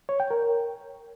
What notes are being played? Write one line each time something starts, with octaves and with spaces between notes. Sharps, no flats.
C#5
G5
A#4